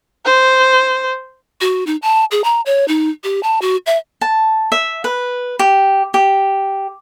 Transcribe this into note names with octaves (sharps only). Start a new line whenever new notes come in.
C5
F#4
D#4
A5
G#4
A#5
C#5
D#4
G4
A5
F#4
E5
A5
E5
B4
G4
G4